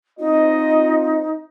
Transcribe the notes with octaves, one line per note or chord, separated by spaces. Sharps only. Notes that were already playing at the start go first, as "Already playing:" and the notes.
C4 D#4 F4 D#5